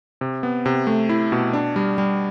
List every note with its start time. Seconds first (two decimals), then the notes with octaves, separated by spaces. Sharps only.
0.21 C3
0.43 B3
0.66 C3
0.87 A3
1.09 E4
1.32 B2
1.53 D4
1.76 G3
1.98 G3